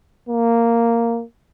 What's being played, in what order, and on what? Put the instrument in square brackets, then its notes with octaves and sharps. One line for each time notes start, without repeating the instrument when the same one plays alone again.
[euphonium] A#3